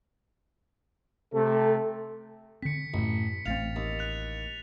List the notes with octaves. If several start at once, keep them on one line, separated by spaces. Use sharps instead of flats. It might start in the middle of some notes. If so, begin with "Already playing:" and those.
C3 A3 A4
D3 C4 B6 C#7
A1 F#2 A2
A1 A3 C4 F5 A6 F7
D#2
F#6 F7